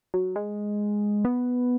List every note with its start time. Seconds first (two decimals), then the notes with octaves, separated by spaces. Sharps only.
0.14 F#3
0.36 G#3
1.25 B3